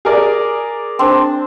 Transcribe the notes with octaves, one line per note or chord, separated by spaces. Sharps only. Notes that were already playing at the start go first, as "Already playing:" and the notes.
G#4 A#4 D5
C4 D4